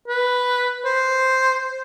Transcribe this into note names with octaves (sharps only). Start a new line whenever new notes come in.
B4
C5